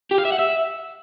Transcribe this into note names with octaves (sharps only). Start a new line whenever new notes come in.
G4
F5
E5
F#5
E5